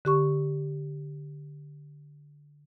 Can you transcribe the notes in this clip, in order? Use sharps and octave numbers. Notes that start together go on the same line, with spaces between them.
D3 G4 C#6